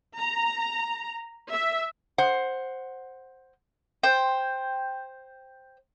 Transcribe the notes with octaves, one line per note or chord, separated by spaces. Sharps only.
A#5
E5
C5 F#5
C5 G5